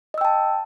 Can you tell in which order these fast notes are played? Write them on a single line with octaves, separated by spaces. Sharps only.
D#5 E6 G5 A5